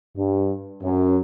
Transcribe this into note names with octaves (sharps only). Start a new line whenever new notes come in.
G2
F#2